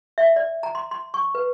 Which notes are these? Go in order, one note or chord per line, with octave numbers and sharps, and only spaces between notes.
E5
D5
A#5
C6
C6
C#6
B4